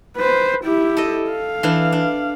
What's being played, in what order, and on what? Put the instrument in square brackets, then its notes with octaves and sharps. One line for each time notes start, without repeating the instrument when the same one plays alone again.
[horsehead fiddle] B4 C5
E4 G4
[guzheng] A4 D#5
[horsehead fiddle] F5
[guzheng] E3 D4
D4